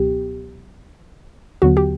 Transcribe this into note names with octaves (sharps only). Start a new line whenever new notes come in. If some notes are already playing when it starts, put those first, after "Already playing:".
Already playing: C#2 B2 F#3 B3 G4
D#2 D3 F#3 B3 F#4
G4